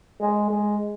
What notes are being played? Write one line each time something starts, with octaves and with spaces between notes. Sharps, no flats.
G#3
G#3